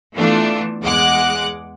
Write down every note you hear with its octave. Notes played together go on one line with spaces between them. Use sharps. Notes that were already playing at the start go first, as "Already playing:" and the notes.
E3 A3 B3 D4 F4
E2 G#3 F#5 D6 F#6